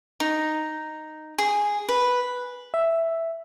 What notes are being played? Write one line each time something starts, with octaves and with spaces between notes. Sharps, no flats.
D#4
G#4
B4
E5